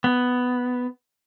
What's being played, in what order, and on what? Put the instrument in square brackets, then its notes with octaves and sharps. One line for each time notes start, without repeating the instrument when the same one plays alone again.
[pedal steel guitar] B3